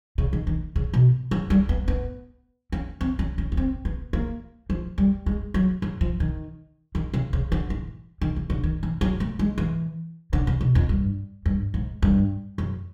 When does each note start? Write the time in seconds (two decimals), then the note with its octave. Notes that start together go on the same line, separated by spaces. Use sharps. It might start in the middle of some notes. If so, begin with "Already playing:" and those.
0.18 C#3
0.33 D#3
0.47 D#3
0.76 C#3
0.94 B2
1.31 F#3
1.50 G3
1.69 B3
1.88 B3
2.72 C#4
3.01 C4
3.19 C#4
3.38 C#4
3.52 B3
3.57 C4
3.85 B3
4.13 A#3
4.70 F3
4.98 G3
5.26 G#3
5.54 F#3
5.82 F#3
6.01 F3
6.20 D#3
6.95 D#3
7.14 C#3
7.33 C#3
7.52 D3
7.70 E3
8.22 D#3
8.36 C#3
8.50 D3
8.64 D#3
8.83 E3
9.01 F#3
9.20 A3
9.39 G#3
9.58 E3
10.33 D3
10.47 C#3
10.61 B2
10.75 F2
10.89 G2
11.46 G2
11.74 G#2
12.02 G2
12.58 F#2